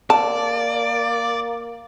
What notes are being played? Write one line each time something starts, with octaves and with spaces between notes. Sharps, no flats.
A#3 D5 A5